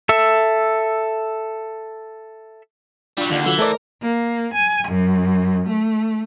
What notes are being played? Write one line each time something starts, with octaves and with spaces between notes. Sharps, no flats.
A4 E5
F#3 G3 D4 F4
D#2 D3
E3 F#3 F4 A4
A3 A4 A#4 C5 D5 D#5
A#3
G#5
F#2
A3